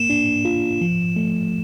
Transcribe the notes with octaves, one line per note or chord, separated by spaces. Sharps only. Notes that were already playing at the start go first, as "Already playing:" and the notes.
Already playing: A#3 E7
D4
F4
F3
A3